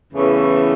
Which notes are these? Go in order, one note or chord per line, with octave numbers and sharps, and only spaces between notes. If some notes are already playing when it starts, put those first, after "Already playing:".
E2 C#3 E3 A3 C#4